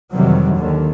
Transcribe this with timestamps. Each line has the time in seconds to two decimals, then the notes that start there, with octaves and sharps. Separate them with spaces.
0.13 F2 C3 D#3 E3 F#3 G3
0.55 D#2 D3 D#3